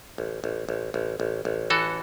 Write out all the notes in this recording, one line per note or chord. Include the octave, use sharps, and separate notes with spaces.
A1
A1
A1
A1
A1
A1
E3 F#4 A4